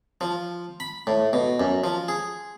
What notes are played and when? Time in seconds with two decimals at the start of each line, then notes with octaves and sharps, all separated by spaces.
0.21 F3
0.80 B5
1.07 A2
1.33 B2
1.60 F#2
1.84 F3
2.08 G#4